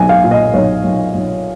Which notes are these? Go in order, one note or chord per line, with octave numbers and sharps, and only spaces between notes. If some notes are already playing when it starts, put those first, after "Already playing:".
Already playing: B1 F#3 G#5
F5
A#2
D#5
B1 C#5
B1
B1